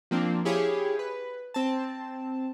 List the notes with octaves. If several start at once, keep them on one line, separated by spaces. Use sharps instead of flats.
F3 A#3 C4 D4
E4 G4 G#4 C#5 F5
B4
C4 A5